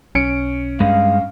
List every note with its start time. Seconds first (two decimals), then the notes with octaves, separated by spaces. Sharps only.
0.15 B1 C#4 C#7 D7
0.80 G2 G#3 F5